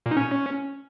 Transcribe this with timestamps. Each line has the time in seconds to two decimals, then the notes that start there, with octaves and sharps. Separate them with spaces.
0.06 A#2
0.11 D#4
0.17 C#4